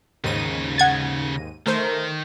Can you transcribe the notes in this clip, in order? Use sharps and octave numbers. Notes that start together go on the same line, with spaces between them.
D#2 G#2 C#3 D#4 D#7
F#5 G#6 A6
D#3 A3 A#4 C5